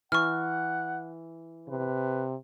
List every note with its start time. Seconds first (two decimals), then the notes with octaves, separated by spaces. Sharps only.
0.12 E3 F#5 C#6 F6
1.68 C3 B4